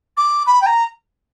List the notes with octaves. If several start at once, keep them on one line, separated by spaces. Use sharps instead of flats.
D6
B5
G5
A#5